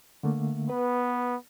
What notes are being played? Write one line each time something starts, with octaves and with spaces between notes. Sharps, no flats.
D3 A3 A#3
B3 B4